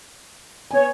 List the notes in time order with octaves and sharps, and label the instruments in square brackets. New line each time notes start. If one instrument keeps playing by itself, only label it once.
[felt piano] B3 G#5 [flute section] C#5